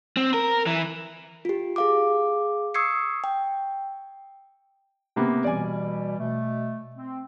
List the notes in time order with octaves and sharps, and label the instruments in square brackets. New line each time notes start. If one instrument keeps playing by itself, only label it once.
[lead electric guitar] C4
A#4
E3
[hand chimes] F4 G4
G#4 F5 D6
C#6 D#6 E6 G#6 C7 C#7
G5
[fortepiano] C3 A#3 B3
[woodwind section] B2 E3 G3 [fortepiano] D5 G#5
[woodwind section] B2 A3
C4